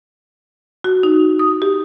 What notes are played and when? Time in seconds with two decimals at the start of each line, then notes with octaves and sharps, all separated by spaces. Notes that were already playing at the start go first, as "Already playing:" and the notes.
0.84 F#4
1.03 D#4
1.39 D#6
1.62 G4